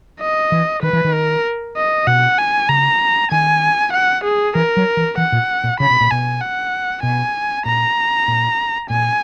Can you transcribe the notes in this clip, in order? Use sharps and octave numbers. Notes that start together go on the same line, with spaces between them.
D#5
E3
D#3 B4
E3
D#3
A#4
D#5
B2 F#5
G#5
C#3 A#5
D#3 G#5
F#5
G#4
E3 A#4
F#3
E3
E3 F#5
A#2
A#2
C#3 B5
B2
A#2
B2 G#5
F#5
B2 G#5
A#2 A#5
A#2
A#2 G#5